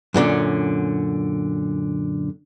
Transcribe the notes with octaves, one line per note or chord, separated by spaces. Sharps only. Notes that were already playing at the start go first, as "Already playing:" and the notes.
F#2 A#2 D3 C#4